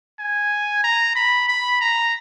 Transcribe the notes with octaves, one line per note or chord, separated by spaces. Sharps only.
G#5
A#5
B5
B5
A#5